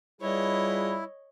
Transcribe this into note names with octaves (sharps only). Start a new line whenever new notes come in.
G3 E4 F4 G#4 B4 C#5 D#5